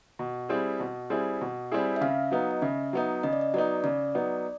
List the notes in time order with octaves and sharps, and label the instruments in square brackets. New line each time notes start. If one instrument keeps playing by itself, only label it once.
[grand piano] B2
G3 C4 E4 G#4
B2
G3 C4 E4 G#4
B2
G3 C4 E4 G#4
[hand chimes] E5
[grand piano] C#3 [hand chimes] F5
[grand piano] F#3 B3 D#4
[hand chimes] D#5
[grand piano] C#3 [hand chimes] E5
[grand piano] F#3 B3 D#4
[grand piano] C#3 [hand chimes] D#5
[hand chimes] D5
D#5
[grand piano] F#3 B3 D#4 [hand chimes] D5
[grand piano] C#3 [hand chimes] D5
[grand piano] F#3 B3 D#4